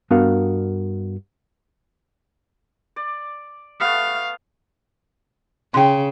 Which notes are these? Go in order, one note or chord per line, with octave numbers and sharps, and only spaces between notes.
G2 B3 D4 F#4 A#4 F5
D5
A3 B3 F5
C#3 G5 C6